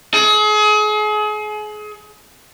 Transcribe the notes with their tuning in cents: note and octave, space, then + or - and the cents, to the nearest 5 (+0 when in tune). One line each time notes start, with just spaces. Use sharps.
G#4 +35